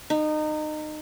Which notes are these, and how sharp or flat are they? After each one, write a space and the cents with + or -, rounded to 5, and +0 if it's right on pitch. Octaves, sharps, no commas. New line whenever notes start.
D#4 -25